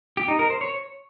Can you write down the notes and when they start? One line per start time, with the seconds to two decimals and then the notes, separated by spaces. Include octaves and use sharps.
0.17 G4
0.28 D#4
0.39 A#4
0.50 C5
0.61 C#5